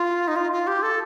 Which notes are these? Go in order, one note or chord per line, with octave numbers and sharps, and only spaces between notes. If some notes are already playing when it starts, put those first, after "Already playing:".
Already playing: F4
D#4
F4
F4
G4
A4